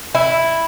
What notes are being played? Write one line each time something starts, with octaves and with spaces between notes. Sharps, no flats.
E4